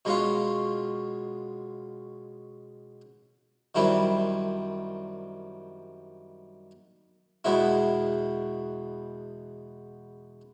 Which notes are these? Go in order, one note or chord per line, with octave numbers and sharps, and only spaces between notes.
B2 G#3 C#4 F4
F#2 D#3 G3 C4 E4
E2 B2 G#3 B3 E4